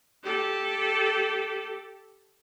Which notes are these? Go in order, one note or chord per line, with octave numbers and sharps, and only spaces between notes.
G4 A4